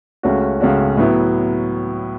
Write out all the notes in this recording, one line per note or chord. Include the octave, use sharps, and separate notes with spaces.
C#2 C#3 A3 C#4 F#4
C#2 C#3 A3 C#4 F#4
A2 F#3 B3 E4